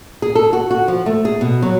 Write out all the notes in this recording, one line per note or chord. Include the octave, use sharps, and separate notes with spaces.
G#4
A4
F#4
F#4
F3
A3
G#4
B2
F#3